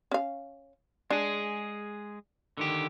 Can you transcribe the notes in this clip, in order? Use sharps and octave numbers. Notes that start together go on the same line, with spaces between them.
C#4 F5
G#3 D4 G#4
D3 D#3 G4